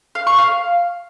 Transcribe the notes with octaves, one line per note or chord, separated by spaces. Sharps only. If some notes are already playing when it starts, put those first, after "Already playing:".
F5
C#6
F5